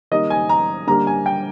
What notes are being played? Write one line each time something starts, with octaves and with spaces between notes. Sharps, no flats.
D#3 G3 A#3 D#5
G#5
A#5
D3 G3 A#3 A#5
G#5
G5